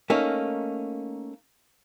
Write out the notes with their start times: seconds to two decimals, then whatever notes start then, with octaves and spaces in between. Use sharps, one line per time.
0.10 A3 A#3 C#4 D#4